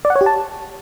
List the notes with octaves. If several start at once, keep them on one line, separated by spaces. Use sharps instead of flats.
D5
F#5
C#5
G4
A5